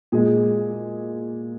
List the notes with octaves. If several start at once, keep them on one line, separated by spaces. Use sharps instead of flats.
A#2 G#3 G#4